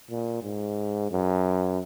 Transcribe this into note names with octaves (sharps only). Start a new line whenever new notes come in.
A#2
G#2
F#2